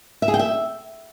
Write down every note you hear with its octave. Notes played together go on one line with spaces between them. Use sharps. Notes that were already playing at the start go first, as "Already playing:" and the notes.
E5
G#4
G5
E5